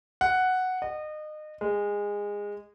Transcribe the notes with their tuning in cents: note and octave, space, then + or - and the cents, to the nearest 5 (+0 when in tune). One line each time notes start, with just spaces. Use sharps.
F#5 +0
D#5 -30
G#3 -20